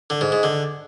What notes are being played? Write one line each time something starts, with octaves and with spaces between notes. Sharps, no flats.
D3
G#2
G#2
D3